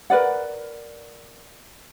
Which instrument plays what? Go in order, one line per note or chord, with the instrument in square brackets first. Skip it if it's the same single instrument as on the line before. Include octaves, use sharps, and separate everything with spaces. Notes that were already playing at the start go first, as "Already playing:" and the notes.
[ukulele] A#4 B4 D5 F#5